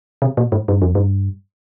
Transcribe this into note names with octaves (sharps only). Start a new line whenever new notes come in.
C3
A#2
G#2
G2
F2
G2